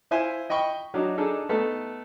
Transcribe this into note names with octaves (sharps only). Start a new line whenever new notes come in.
E4 C5 E5 F5 G#5
D#5 G5 B5 C#6
F#3 D4 D#4
D4 D#4 G#4 A4
A3 B3 D#4 A4